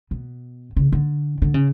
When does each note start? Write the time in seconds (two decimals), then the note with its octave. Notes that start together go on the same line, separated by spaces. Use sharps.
0.11 B2
0.76 C#3
0.92 D3
1.42 D3
1.54 C#3